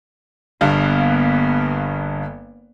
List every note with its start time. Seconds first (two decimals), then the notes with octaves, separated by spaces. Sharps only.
0.61 G1 G2 A#3 B3 F5